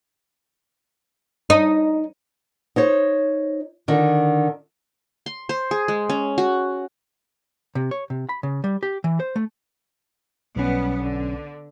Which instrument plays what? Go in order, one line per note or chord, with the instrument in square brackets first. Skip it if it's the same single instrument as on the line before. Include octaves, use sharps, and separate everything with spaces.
[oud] D#4
[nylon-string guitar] D#4 C5 C#5
D3 D#3
[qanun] C6
C5
G#4
G#3
C#4
F#4
[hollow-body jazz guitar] C3
C#5
C3
B5
C#3
G3
G4
E3
C5
A3
[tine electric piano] B1 C#4 [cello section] G3 B3
[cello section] D3